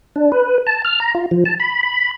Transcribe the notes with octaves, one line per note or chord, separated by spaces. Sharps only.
D4
B4
A5
F6
A#5
F4
F3
A5
B5
B5